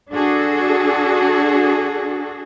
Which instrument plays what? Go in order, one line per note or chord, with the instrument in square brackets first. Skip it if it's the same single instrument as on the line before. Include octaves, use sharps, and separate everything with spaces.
[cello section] D4 F#4 G#4 A4